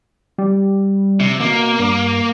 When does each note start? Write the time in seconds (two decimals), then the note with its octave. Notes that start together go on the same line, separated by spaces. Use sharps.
0.38 G3
1.20 C3
1.40 B2 A#3
1.79 G2